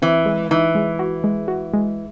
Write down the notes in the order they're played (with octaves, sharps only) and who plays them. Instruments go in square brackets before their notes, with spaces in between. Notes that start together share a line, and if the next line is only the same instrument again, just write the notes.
[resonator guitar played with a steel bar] E3 [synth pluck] C4
[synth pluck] G#3
[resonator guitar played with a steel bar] E3 [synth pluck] D#4
[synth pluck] G#3
F#4
G#3
F#4
G#3